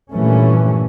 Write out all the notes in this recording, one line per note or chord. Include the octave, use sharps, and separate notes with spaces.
G2 A#2 E3 A3 C#4